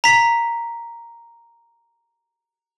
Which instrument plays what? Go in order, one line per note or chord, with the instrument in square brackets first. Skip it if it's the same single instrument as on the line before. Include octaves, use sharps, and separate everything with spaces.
[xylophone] A#5 B6